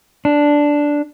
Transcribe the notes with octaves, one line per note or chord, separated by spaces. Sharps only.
D4